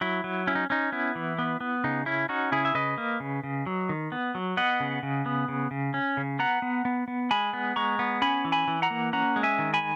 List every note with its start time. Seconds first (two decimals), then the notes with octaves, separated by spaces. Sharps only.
0.01 F#3 E4
0.24 F#3
0.47 C#4 E4
0.55 D#4
0.70 C#4 D#4
0.92 B3 E4
1.15 E3
1.39 B3
1.61 B3
1.84 C#3 D#4
2.06 C#4 E4
2.29 C#4 D#4 F#4
2.52 C#3 E4 G#4
2.65 E5
2.75 C#3 B4 D#5
2.98 A#3
3.20 C#3
3.44 C#3
3.66 F#3
3.89 D#3
4.12 B3
4.35 F#3
4.57 B3 D#5 F#5
4.80 C#3
5.03 C#3
5.26 B3
5.48 C#3
5.71 C#3
5.94 C#4
6.17 C#3
6.39 B3 F#5 A#5
6.62 B3
6.85 B3
7.08 B3
7.31 G#3 G#5 B5
7.53 B3
7.76 G#3 A#5 C#6
7.99 B3
8.22 C#4 G#5 B5
8.45 E3
8.52 G#5 B5
8.68 E3
8.82 F#5 A#5
8.91 A#3
9.13 C#4 F#5 A#5
9.36 G#3
9.43 E5 G#5
9.59 D#3
9.74 G#5 B5